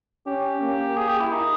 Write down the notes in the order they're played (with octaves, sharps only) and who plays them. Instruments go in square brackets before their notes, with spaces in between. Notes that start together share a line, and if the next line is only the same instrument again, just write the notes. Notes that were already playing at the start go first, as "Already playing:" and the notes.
[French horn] C#4 [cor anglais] G4
[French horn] A#3
[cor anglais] G#4
G4
E4
D#4